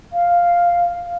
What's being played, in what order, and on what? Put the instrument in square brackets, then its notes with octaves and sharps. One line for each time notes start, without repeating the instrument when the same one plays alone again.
[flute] F5